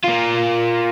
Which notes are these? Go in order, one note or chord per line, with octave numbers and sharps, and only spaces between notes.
A#3 F4